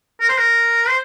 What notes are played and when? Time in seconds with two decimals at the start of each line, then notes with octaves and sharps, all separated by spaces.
0.21 A#4
0.29 C5
0.38 A#4
0.88 C5